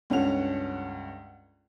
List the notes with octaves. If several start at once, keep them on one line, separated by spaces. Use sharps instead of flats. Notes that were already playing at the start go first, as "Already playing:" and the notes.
C#2 G2 C#4 A4 F#5 F7